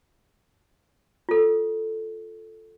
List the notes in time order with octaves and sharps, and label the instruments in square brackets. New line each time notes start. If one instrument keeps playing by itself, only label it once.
[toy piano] F4 A4